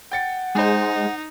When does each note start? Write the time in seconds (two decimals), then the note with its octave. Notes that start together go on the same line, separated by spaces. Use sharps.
0.12 F#5 G5 A6 C#7
0.55 G#3 D#4 C5 G#5